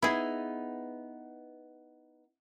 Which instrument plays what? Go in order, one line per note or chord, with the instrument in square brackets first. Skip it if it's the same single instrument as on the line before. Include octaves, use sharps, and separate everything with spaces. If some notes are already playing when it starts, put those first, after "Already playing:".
[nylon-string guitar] B3 D#4 [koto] E4 G#4